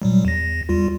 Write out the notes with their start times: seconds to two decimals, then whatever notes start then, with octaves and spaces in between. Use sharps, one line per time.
0.02 A#2 F#3 G3
0.25 E2 A#6
0.69 E2 G3 F4